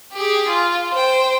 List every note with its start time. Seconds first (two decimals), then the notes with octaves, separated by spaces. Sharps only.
0.13 G4 G#4
0.48 F4
0.93 C5 G5